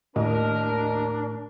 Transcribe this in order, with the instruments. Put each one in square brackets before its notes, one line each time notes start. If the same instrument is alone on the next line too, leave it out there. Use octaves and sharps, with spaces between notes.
[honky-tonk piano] D#2 D#5 [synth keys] A2 [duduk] D4 [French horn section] A#4